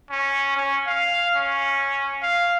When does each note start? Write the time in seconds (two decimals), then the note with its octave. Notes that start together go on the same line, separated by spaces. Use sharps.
0.10 C#4
0.56 C#4
0.87 F5
1.36 C#4
2.22 F5